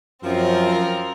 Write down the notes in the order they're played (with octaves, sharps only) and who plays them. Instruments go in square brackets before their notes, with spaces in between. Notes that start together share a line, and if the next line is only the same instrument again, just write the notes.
[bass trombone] F#2 [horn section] F3 [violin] C4 A#4